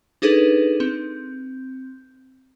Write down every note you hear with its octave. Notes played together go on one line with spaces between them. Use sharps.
D4 D#4 G#4 A4 B4
C4